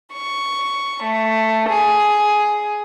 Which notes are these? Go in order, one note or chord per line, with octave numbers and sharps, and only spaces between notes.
C#6
A3
G#4